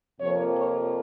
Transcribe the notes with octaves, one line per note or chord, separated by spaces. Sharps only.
F2 C3 F3 A#3 C#5
C#5